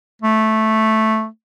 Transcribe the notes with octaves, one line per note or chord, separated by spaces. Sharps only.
A3